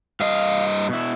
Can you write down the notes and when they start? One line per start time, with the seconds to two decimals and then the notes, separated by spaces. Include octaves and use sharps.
0.20 G2 D#5 F5
0.89 B2 E4